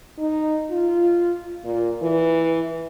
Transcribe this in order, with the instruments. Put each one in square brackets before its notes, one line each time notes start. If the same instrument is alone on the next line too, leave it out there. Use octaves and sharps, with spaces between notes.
[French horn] D#4
F4
A#2
E3